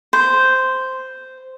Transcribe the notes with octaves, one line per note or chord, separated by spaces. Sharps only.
C5